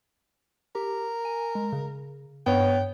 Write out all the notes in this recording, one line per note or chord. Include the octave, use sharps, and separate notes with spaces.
G4 A#4
G#5
G#3
C#3
G2 B3 C#5 G5